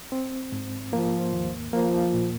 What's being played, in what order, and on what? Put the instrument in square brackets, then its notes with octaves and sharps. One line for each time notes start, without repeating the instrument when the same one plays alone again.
[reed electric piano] C4
G#2
[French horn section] F3 [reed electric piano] A#3
[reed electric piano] D#2
[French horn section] F3 [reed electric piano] A#3
[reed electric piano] A#2